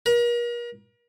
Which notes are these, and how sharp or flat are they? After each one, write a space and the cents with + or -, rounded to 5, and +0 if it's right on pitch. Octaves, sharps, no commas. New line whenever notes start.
A#4 +40